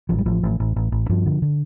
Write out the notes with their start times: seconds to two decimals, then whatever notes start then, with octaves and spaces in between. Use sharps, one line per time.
0.09 A1 F3
0.19 G3
0.26 A1 F3
0.43 A1
0.60 A1
0.76 A1
0.92 A1
1.09 G2 F3
1.26 D3
1.42 D3